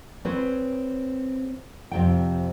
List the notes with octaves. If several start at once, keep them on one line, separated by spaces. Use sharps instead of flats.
C4 G#4 B4 C#5
F2 C3 G5